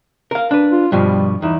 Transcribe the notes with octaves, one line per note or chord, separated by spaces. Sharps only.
A#4 F5
D4 B4
F4
G2 B2 F3 G3
E2 D#4 E4